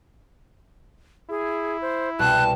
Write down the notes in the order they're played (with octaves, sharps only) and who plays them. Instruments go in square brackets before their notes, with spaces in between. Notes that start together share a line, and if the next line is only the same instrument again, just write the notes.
[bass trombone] E4 [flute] G#4
[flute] C5
[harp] C2 B2 [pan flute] A5 [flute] F#6